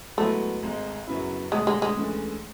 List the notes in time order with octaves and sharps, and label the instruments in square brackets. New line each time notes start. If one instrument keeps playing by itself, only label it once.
[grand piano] G#2 F#3 B3 E4 [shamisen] A3
[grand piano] G#1 G#2 G#3
F#2 C#3 F#3 B3 E4
[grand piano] E1 D2 D3 [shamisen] G#3
[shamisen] G#3
G#3
[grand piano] C#2 C#3 E3 A3 D4